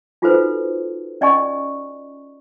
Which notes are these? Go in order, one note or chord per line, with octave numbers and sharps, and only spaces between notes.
D#4 F4 F#4 A4 B4 C5
C#4 D5 D#5 G#5 C#6